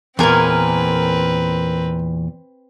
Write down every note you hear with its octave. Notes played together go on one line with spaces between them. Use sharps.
E2 A#2 C4 A#4 B4 G#5